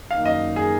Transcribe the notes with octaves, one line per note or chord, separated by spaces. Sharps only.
F#2 D#3 A#3 D#4 F5
D#5
G#4